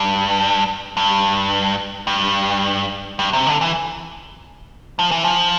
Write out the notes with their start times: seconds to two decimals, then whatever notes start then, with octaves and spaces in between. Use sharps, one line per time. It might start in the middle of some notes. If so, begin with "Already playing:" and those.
Already playing: G2
0.97 G2
2.07 G2
3.19 G2
3.33 C3
3.46 D3
3.61 E3
4.99 F3
5.11 E3
5.24 F3